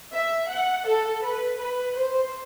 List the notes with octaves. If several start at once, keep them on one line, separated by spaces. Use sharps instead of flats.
E5
F#5
A4
B4
B4
C5